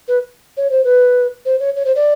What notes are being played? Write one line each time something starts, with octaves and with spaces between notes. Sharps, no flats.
B4
C#5
C5
B4
C5
C#5
C#5
C5
D5